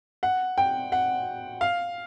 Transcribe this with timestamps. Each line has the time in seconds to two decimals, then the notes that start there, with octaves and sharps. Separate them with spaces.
0.23 F#5
0.58 G5
0.92 F#5
1.61 F5